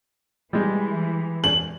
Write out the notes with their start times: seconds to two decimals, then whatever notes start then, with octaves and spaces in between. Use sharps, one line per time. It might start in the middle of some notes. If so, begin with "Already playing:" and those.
0.53 E3 G3 G#3
1.44 F#7